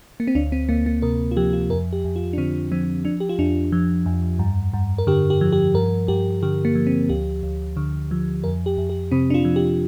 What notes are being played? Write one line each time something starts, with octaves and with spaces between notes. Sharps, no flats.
A#3
C4
D2 D4
C4
D2 A#3
A#3
C3 A#4
F4
F3 G4
F4
F2 A#4
G4
F2
F4
D4
D3 C4
F3 C4
F3 D4
G4
F4
F2 D4
F3
F2
G2
G2
A#4
D3 G4
G4
F3
G4
G2 A#4
G2 G4
D3 G4
A#3
F3
C4
D2 G4
D2
D3
F3
F2 A#4
G4
F2
G4
C3 C4
D4
F4
F3
G4